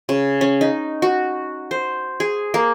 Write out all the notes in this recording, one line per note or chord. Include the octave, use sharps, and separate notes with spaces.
C#3
C#4
D#4
F#4
C5
G#4
A#3